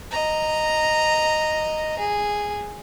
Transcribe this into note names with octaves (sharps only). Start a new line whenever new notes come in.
D#5 A#5
G#4